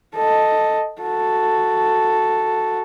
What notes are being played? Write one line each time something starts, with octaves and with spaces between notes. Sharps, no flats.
A4 D#5
F#4 A4